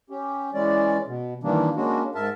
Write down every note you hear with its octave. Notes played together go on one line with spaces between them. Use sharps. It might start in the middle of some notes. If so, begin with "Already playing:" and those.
C#4 G4
E3 G#3 C#4 D5
B2
D#3 E3 G3 A#3 D4
G#3 A#3 C#4 D4 F#4
G#2 A#4 E5 A5